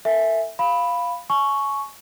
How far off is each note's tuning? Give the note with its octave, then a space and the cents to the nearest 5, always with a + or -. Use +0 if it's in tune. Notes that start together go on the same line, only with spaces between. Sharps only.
A4 +35 E5 +0 G#5 +0
F5 +0 B5 +0
G#5 +35 C#6 +0